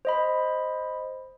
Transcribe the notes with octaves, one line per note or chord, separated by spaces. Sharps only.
C5 D#5 B5